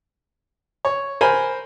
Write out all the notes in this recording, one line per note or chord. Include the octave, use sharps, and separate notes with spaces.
C#5
A#4 C5 G#5 B5